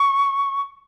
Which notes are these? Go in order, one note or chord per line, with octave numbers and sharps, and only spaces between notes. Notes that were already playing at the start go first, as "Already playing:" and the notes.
Already playing: C#6